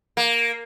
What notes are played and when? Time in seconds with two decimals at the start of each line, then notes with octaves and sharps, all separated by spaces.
0.17 A#3